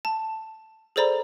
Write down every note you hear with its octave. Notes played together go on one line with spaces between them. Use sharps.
A5
G#4 A4 C5 D5 A#5 B5